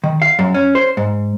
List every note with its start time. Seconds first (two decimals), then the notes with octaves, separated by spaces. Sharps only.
0.04 D#3
0.22 F5
0.39 F#2
0.54 C#4
0.75 C5
0.97 G#2